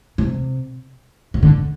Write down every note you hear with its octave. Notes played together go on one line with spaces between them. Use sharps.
C3
C3
D3